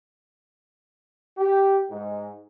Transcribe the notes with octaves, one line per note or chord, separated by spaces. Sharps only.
G4
G#2